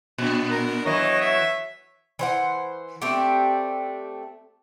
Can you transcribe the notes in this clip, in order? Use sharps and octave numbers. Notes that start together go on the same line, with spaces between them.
A#2 B3 D4
A#4
E3 F#3 C#5 D#5
E5
E3 C5 F#5
A3 C4 D4 G4